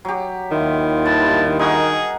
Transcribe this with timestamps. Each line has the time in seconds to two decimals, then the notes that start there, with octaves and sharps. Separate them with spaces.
0.05 F#3 G4
0.51 D#2 D#3 E4 F4
1.05 G2 D3 B4 A5
1.59 D#3 D#4 F#4 G#4 A#4